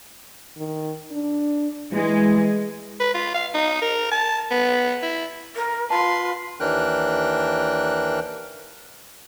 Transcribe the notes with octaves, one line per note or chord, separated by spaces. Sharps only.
D#3
D4
E3 G#3
B4
F4
F5
D#4
A#4
A5
B3
E4
A#4
F4 B4 A5 C6
D#2 E3 D4 A#4 G5 F#6